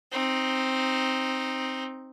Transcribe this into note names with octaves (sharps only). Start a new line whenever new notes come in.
C4 D#4